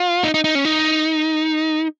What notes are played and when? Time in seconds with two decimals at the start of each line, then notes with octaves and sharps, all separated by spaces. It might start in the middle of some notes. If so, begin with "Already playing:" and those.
Already playing: F4
0.24 D#4
0.34 D#4
0.44 D#4
0.55 C#4
0.65 D#4